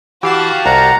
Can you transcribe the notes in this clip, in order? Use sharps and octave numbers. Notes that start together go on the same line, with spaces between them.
E3 F#4 G4 F5 A5
C2 F#5 A#5